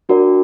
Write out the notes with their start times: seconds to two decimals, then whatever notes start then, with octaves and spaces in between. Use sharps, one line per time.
0.09 D4 F#4 A#4 D5